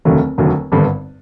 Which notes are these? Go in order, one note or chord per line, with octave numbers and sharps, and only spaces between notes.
F1 D#2 D3 F#3 A3
F1 D#2 D3 F#3 A3
G#1 G2 D3 G3 B3